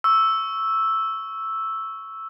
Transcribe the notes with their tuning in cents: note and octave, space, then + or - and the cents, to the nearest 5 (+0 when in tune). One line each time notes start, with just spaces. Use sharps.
C#6 +5 E6 +0